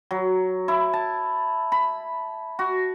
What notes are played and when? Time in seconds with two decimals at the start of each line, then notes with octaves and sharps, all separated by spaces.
0.11 F#3
0.68 E4
0.93 A5
1.72 B5
2.59 F#4